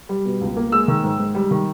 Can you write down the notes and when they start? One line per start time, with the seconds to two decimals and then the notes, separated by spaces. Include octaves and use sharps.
0.09 G3
0.25 B2
0.41 C#2
0.56 A#3
0.72 G#3 E6
0.88 D#3
1.03 G#2
1.19 G#2
1.35 G3
1.51 D#3